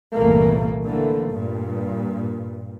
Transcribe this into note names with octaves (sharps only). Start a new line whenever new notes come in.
G1 C2 A#2 E3 A3 A#3
D3 E3 A3 A#3
G2 A#2